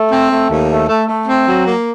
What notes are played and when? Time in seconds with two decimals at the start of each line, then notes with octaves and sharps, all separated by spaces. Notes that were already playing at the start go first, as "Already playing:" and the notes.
Already playing: A3
0.12 C4
0.31 A3
0.50 D#2
0.70 A3
0.89 A3
1.09 A3
1.28 C4
1.47 F#3
1.67 A#3